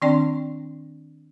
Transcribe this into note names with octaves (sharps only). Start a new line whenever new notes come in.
D#3 C4 D4 D5 G5 C6